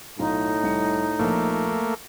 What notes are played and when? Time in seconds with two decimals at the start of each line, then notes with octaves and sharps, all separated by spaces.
0.19 B1 A2 D#4 F4 A#5
0.64 C2 C#7
1.19 A#1 F3 A3 A#3 C#5